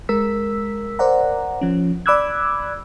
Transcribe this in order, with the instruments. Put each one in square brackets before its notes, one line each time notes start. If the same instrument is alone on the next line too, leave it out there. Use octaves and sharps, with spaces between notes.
[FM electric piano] G#3 A#4 E6 B6
A#4 C5 D5 F#5 A#5
F3 C#4
D5 B5 D6 E6 F#6 G#6